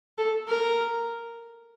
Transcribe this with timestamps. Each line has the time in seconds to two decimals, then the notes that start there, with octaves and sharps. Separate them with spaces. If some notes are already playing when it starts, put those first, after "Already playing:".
0.18 A4
0.48 A#4